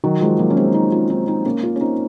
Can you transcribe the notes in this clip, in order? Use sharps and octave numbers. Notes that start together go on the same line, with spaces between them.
D#3 F#3
F3 G#3
F#3 A#3
C#4
G#3 C4
C4 D#4
C#4 F4
C4 D#4
C4 D#4
A#3 C#4
C#4 F4
C#4
C4 D#4